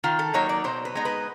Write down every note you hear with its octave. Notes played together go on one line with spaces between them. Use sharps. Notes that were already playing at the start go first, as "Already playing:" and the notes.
D#3 F4
A4
F#3 A#3 D#4 C#5
D5
B2 C5
B4
G#3 B3 D#4
B4